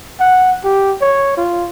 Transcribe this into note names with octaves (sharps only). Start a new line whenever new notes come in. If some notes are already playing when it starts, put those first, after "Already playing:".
F#5
G4
C#5
F4